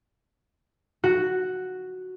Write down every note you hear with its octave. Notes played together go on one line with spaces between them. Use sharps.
F#4